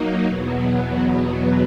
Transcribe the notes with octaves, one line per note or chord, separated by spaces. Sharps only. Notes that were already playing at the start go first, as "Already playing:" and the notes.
Already playing: F#3 A#3 D#4
E2 B2 F#3 B3